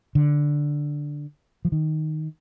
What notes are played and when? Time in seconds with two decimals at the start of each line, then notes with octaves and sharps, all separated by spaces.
0.15 D3
1.65 F3
1.72 D#3